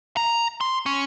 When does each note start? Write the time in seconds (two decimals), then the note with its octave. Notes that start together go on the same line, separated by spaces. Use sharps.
0.17 A#5
0.61 C6
0.86 C#4